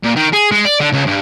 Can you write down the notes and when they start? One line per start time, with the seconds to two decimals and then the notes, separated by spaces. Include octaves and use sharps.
0.04 A#2
0.16 D#3
0.33 G#4
0.52 G#3
0.65 D5
0.81 D3
0.93 C#2
1.07 G2